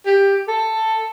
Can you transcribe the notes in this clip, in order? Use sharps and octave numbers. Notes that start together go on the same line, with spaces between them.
G4
A4